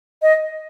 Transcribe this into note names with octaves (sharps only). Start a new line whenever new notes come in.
D#5